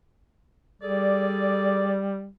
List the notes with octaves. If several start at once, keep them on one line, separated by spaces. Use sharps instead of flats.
G3 G#4 A4 D5